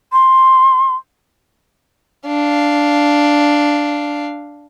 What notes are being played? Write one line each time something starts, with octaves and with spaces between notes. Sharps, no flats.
C6
D4 F5